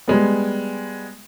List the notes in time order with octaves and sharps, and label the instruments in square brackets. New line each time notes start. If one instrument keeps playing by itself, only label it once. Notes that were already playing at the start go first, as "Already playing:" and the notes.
[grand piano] G3 G#3 B3